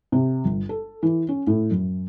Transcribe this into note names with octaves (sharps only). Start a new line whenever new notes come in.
C3
G1
A4
E3
C#4
A2
F#2